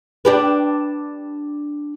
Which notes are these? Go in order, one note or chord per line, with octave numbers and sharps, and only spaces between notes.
D4 G4 B4